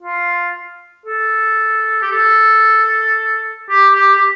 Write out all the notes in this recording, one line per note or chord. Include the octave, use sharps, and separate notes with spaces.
F4
A4
G4
A4
G4
G4
G4